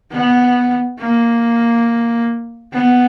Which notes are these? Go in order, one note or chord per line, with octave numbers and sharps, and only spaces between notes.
B3
A#3
B3